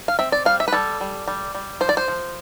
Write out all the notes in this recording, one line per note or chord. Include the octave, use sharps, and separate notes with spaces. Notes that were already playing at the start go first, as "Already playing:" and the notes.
F5
C4 E5
D5
G3 F5
E5
B4
G3 A4
G3
G3
G3
F3 C5
D5
C5
F3